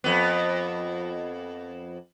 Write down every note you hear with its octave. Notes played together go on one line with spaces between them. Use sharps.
F2 B3